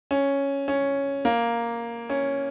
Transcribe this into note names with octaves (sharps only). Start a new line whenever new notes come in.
C#4
C#4
A#3
C#4